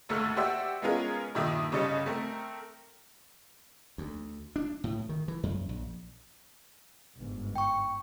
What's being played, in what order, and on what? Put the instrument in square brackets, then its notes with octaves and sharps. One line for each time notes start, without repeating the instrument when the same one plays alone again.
[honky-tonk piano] G#1 D2 A3 A#3 E6 F6
F#4 G4 C5 D5 E5 F#5
G#3 B3 C#4 F4 G#4 A#4
G2 A#2 D#3 E5 D6 D#6
G1 C#3 G3 D#5 A6 C#7
A3 C4 A#4
[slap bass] D2
D4
A2
D#3
E3
F#2
A#1
[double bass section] G1 G#2
[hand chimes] G5 C#6